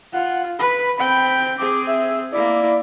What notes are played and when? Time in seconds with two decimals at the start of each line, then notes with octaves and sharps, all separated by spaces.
0.13 F4 F#5
0.59 B4 B5
0.97 C4 G5 B5
1.58 C4 G#4 D6
1.87 E5
2.32 A#3 E4 D5